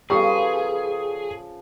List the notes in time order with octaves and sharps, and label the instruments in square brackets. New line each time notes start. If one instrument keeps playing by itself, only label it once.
[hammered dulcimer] C#3 F3 B4 [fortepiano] G3 [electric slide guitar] G#4 [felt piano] A4 C#6 D#6